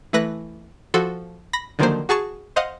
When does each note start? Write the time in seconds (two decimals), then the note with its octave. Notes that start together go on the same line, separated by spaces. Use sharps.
0.13 E3 A3 B4 F#6 A#6
0.94 F3 F#4 A4 C6
1.53 B5 A#6
1.79 D3 D#3 F3 F#3 A#3 C5
2.09 F#4 G#4 A5 C#6
2.56 C5 D#5 F5 F#5